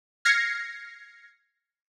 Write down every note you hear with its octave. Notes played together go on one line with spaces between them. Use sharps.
F6 G#6 A#6 C7 C#7